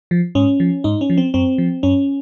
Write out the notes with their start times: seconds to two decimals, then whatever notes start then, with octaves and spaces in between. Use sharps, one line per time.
0.11 F3
0.35 G#2 C#4
0.60 F3
0.84 G#2 D#4
1.01 C#4
1.10 F3
1.17 C4
1.34 F#2 C4
1.58 F3
1.83 F#2 C#4